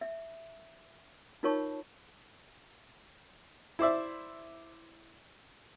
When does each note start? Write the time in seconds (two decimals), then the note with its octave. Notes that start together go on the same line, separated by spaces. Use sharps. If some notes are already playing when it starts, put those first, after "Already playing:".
0.01 E5
1.43 D#4 F4 A#4 C#5 A5 C#6
3.79 E4 C5 D5 E5